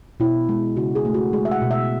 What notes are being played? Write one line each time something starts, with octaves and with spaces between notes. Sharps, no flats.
B2 E4
G#3
C#3 F#4
G#4
A3
F#4
G#3 G#4
E5
F#5
B2
E5